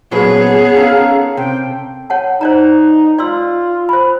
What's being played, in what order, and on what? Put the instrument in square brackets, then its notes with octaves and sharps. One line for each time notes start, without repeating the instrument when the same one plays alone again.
[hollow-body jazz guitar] A#2 F#3 B4 [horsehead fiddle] B3 G#4 [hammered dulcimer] C#4 A4
[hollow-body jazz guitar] C#4 [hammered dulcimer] A4 A#4 [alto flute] F5
[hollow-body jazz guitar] C3 [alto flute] G5
[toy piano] C#5 F#5 A5
[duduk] D#4 [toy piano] C5 D5 A#5
[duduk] F4 [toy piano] D5 C6 E6
[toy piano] C5 B5